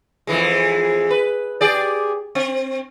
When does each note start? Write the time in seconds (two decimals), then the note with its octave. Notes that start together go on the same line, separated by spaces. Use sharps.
0.27 F2 E3 G#3
1.10 B4
1.61 G4 G#4 D5
2.35 C4